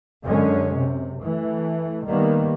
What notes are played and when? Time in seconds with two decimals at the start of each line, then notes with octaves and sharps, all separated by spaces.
0.24 F#2 D3 G#3 C#4
0.76 C3
1.24 E3 A3
2.06 D#3 G3 A#3 B3